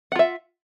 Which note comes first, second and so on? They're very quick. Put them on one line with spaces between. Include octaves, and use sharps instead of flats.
F#5 F4 E5